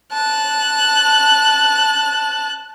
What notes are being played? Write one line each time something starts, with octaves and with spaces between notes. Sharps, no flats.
A5 F#6